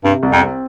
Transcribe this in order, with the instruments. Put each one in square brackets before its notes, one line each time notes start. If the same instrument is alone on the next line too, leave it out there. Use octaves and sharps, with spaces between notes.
[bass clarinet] G2 [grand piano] C3
[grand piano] C2
[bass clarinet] F2
[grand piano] C4